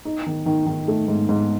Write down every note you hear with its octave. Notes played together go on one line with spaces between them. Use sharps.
D#4
D#3
D#3
D#3
A3
G#2
G#2